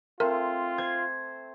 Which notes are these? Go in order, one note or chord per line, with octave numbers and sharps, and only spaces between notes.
A3 C4 F4 A#4
C5 G#6